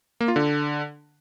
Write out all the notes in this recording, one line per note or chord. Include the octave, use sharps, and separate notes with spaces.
A#3
F4
D3